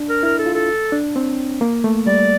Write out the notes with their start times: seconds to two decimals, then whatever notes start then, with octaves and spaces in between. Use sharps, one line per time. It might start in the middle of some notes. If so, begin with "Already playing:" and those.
Already playing: D4
0.09 A#4
0.23 E4 A#4
0.39 A4
0.46 F4
0.54 A4
0.92 D4
1.16 C4
1.61 A#3
1.84 A3
2.07 G3 D5